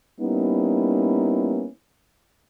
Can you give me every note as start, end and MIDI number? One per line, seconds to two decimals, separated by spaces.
0.20 1.68 55
0.20 1.68 58
0.20 1.68 59
0.20 1.68 61
0.20 1.68 63
0.20 1.68 64